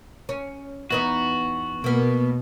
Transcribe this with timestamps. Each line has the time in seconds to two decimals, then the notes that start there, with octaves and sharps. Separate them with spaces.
0.29 C#4
0.90 E2 B3 D#4 F#4
1.84 B2 A#3 B3